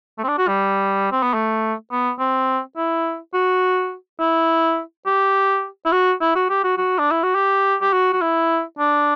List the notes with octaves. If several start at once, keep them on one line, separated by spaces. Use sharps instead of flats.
A3
C4
D4
F#4
G3
C4
B3
A3
B3
C4
E4
F#4
E4
G4
E4
F#4
E4
F#4
G4
F#4
F#4
D4
E4
F#4
G4
G4
F#4
F#4
E4
D4